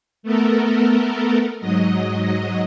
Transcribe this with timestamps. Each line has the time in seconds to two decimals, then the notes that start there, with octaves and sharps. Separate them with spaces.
0.23 A3 B3 A4 A#4
1.60 G#2 F#3 D#5